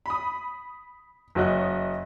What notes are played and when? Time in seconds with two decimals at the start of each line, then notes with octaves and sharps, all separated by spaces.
0.06 B5 D#6
1.35 F#1 F#4 C#5 D#5 F#6